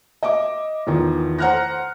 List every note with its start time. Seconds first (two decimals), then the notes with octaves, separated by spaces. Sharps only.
0.23 D#5 E5 D6
0.87 E2 D#3 F3
1.38 C5 F#5 A#5 F6 F#6 A#6